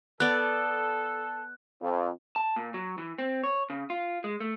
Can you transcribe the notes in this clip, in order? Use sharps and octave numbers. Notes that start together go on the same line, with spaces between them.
B3 A4 D5 F#6
F2
A5
A#2
F#3
E3
C4
C#5
C#3
F4
G#3
A3